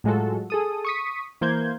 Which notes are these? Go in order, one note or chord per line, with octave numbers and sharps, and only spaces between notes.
A2 F#3 G#3 F4 F#4 A4
G#4 A4 D#6
C#6 D#6 B6
E3 A#3 C5 G6 G#6